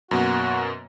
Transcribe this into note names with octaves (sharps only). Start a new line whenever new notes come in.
F#2 B2 A#3 F#4